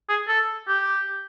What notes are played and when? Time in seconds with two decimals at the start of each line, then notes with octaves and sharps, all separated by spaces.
0.09 G#4
0.28 A4
0.68 G4